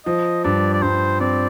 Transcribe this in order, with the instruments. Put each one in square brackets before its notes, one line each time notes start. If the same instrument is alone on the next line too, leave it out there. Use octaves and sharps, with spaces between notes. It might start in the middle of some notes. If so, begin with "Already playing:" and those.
[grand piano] F3 [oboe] D#5
[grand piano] G2 [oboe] D5
[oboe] D5
[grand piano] G2 [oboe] C5
[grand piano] C4 [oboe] D5